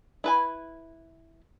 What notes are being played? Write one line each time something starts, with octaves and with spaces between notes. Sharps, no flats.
E4 B4 G#5